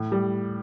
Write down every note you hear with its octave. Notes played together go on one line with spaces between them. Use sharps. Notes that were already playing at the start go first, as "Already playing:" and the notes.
Already playing: A2
G3